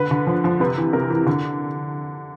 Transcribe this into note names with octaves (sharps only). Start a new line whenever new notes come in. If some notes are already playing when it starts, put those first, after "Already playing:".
Already playing: D3 B4
D3
F3
F3
C3 B4
E3
C3 A#4
E3
D3